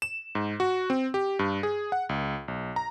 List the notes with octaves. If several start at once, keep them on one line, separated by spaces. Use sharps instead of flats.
E7
G#2
F#4
C4
G4
G2
G#4
F#5
C#2
B1
A#5